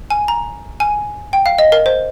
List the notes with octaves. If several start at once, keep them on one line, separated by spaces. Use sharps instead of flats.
G#5
A#5
G#5
G5
F5
D#5
A#4
C5